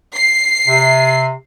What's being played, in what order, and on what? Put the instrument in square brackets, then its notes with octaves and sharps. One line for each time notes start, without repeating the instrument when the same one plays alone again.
[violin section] C7
[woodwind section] C3